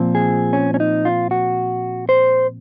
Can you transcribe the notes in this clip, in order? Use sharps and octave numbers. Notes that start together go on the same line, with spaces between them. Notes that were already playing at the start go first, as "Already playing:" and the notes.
Already playing: A#2 F3 C4
G#4
C#4
C#4
D#4
F4
F#4
C5